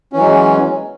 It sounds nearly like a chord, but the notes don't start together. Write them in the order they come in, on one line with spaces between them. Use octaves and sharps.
C#4 E3 F#3 G#3